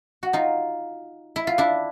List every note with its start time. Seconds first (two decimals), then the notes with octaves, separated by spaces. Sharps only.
0.23 F#4
0.33 D#4 F4
1.36 E4
1.47 F4
1.58 D4 E4